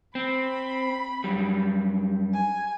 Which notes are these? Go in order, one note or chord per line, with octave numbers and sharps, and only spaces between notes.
C4 B5
F#2 G3
G#5